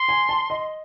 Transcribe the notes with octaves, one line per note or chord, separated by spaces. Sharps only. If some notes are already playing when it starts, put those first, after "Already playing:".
Already playing: C6
G#5
A5
D#5